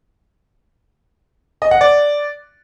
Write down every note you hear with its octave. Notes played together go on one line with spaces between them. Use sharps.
D#5
F#5
D5